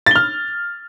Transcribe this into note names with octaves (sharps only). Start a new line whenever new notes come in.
F6 A6 G7